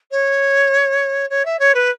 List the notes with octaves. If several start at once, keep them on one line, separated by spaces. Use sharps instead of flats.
C#5
C#5
E5
C#5
B4